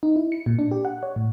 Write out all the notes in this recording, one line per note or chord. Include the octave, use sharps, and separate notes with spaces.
D#4
E4
C#7
A#2
D4
G4
F#5
C#5
A2